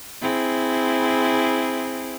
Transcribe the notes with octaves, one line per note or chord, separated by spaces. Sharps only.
C4 E4 G#4